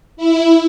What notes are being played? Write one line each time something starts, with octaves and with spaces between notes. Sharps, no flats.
E4